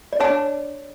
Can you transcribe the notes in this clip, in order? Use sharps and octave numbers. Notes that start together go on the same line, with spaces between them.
D5
D4 C#5